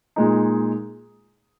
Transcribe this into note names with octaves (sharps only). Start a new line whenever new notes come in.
A#2 G#3 D#4